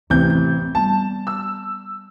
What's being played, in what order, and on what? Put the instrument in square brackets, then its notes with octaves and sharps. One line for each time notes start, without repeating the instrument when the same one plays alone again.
[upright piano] A1 C3 G6 [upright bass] D2
[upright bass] C4
[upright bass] G3 B3 [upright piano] A5
[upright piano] E6